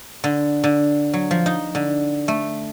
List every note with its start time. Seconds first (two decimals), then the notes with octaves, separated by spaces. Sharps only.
0.24 D3
0.64 D3
1.13 F#3
1.31 F3
1.46 D#4
1.75 D3
2.28 A3